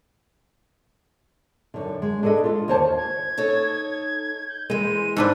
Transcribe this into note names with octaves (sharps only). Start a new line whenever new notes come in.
F#2 D3
G#3
D4 G#4 A4 B4 D#5
F4 A4
D#2 A#3 C5 C#5 A5
G#6
D#4 A4 C#5
G6
E3 G#3 C4 D#7
G#2 D4 B4 C5 D6 E6